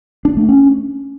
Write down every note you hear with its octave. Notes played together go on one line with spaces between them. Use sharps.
D4
A3
C#4